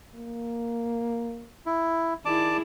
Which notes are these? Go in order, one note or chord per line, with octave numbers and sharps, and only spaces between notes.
A#3
E4
D#3 E4 G#4 D5 A5 D6